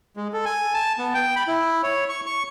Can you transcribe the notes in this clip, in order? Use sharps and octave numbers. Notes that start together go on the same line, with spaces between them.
G#3
A4
G#5
A5
B3
G5
B5
E4
C#5
C#6
C#6